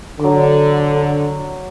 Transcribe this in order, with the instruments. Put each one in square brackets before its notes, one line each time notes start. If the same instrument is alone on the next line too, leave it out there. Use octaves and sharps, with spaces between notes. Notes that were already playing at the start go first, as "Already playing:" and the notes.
[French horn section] D3 [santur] F#3 D6